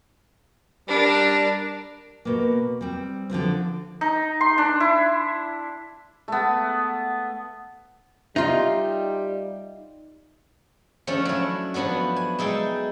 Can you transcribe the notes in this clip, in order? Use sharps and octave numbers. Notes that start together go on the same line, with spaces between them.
G3 D4 A#4
B2 A#3
G3 C4
D3 F3 F#3 C4
D#4
C6
D4
E4
A3 B3
G3 D#4 F4 E5
F3 A3 C#4 D4
F#3 E4
F3 F#3 B3 D4 F#4
G#5
G#3 D#4 E4 A4 G5